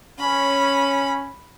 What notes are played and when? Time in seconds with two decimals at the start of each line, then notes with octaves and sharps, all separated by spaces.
0.20 C#4 B5